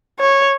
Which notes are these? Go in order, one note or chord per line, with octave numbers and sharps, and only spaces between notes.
C#5